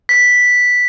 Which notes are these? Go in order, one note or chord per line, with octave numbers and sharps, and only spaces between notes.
B6